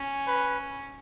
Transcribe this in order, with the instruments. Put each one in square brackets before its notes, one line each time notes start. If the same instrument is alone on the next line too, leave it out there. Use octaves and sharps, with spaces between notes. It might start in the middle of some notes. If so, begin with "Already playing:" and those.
Already playing: [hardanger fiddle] C#4
[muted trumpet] B4